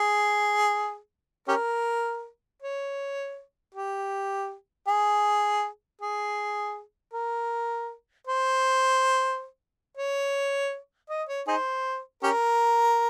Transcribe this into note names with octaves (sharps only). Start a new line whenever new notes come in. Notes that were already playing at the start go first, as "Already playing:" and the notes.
Already playing: G#4
C#4 G4 A#4
C#5
G4
G#4
G#4
A#4
C5
C#5
D#5
C#5
D#4 G#4 C5
C#4 G4 A#4